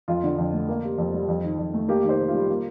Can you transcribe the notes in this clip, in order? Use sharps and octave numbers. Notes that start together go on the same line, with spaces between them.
F2 F4
D3
F2
A3
A#3
C3
F2
G3
F2
D#3
F2
A3
A#3 G4
D#3
C5
C3
F4
G3
A#3